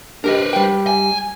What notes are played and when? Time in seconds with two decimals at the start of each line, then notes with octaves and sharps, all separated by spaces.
0.24 D4 G4 A#4 B4 D#5
0.53 G3 G5
0.87 G#5